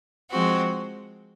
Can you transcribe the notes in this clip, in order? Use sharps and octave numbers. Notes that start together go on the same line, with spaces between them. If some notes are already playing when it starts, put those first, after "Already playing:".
F3 G#3 C4 F#4